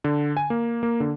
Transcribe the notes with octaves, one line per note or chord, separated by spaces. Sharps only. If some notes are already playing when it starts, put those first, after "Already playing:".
D3
G#5
A#3
A#3
D3